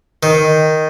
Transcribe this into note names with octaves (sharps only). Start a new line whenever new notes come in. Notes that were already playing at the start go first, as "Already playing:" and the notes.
D#3